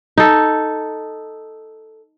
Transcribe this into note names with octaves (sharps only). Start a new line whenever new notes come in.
D#4 A4